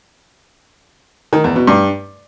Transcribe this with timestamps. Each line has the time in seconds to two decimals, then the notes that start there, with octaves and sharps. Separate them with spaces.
1.33 D#3
1.44 E2
1.56 B2
1.67 G2